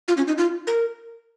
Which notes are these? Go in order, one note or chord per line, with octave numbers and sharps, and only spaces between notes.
F4
C#4
D#4
F4
A#4